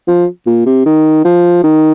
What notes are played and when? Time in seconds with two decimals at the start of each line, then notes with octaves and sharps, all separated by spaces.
0.08 F3
0.47 A#2
0.66 C3
0.85 D#3
1.25 F3
1.64 D#3